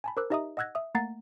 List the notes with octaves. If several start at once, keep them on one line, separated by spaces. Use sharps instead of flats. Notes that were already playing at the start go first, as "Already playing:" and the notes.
G#5 A5 B5
A#4 C5 D6 E6 F#6
D#4 G4 D#5 E5 A#5 D#6
D#5 F#5 E6 F#6 G#6 A#6
E5 D#6
A3 A#3 F#5 A#5 A6 C7